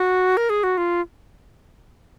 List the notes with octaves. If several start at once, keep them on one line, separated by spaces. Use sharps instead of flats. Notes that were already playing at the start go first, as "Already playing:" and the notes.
Already playing: F#4
A#4
G#4
F#4
F4